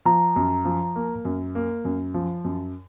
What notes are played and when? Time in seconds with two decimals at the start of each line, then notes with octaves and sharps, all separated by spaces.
0.05 F3 A#5
0.36 F#2
0.65 F3
0.96 A#3
1.25 F#2
1.55 A#3
1.85 F#2
2.14 F3
2.45 F#2